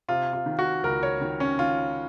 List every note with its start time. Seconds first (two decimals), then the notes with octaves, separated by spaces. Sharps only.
0.08 C3 F4
0.33 F4
0.46 D#3
0.59 F#4
0.83 C#2 A#4
1.03 C#5
1.21 D#3
1.40 C#4
1.59 D#3 F4